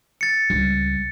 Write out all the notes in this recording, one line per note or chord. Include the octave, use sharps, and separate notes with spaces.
A6 C#7
C#2 G3